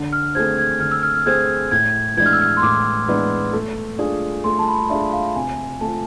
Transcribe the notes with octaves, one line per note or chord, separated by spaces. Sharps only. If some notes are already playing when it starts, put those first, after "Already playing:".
Already playing: D3
F6
A3 C4 G#4 C5 G#6
G#6
D3 F6
E6
F6
F6
A3 C4 G#4 C5 G#6
A2 G#6
E3 G#3 B3 D4 G#6
F6
E6
F6
C6
A2 D6
E3 G#3 B3 D4
A3
D4 F4 G#4
A3 C6
A5
B5
D4 F4 G#4 E5
F5
C3 G#5
F3 A3 A5